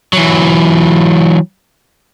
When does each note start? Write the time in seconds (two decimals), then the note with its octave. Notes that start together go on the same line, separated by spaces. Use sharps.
0.13 E3 F#3